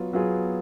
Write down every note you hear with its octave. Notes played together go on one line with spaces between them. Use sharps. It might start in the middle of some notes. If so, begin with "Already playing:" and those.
Already playing: F#3 B3 F4
F#3 B3 F4 G#4